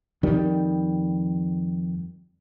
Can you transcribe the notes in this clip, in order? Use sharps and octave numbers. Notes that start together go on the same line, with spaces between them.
F2 D#3 G3